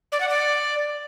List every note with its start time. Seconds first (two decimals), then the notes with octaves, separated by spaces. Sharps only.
0.12 D5
0.21 F#5
0.29 D5